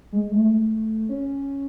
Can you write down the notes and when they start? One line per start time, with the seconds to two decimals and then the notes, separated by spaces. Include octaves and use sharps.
0.12 G#3
0.31 A3
1.09 C#4